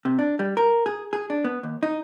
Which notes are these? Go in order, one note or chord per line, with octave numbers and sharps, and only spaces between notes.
C3
D4
G3
A#4
G#4
G#4
D4
B3
D#2
D#4